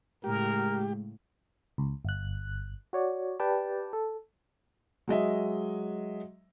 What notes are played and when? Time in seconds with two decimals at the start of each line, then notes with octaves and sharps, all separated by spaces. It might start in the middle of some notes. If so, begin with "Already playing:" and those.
0.24 A2 C#3 G#3 G4 A#4
1.78 C#2
2.05 G1 F#6
2.93 F#4 C#5 D5
3.40 G4 B4 D5 G5 A5
3.93 A4
5.08 F#3 G#3 D#5 E5